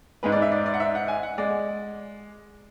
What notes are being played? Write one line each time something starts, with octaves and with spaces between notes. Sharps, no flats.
G#2 G#3 B4
D5
E5
D5
D5
F#5
E5
F#5
G#5
F#5
G#3 D5